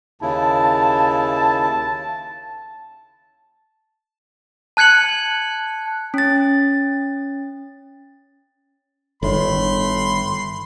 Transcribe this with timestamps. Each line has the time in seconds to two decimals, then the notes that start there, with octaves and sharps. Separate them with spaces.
0.22 D#2 C#3 E4 A5
4.77 A5 F#6 G#6 C#7 F#7
6.14 C#4 A6
9.23 G1 A2 D#3 B5 C6